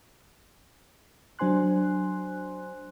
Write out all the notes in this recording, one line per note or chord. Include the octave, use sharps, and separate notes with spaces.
F#3 D4 C5 G#5 C6 F#6